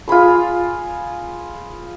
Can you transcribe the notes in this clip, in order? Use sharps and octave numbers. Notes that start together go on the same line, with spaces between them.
F4 G#4 B5 C6